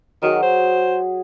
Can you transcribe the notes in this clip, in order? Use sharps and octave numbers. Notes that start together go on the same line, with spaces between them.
D#3 F#3 G#4
C5